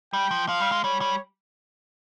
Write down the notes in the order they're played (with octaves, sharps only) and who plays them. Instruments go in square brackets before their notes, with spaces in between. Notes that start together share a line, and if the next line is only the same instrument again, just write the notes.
[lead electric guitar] G3 [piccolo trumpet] G5
[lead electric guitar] F3
[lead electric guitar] F3 [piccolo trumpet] F5
[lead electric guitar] G3
G#3
[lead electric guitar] G3 [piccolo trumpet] C#5
[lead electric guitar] G3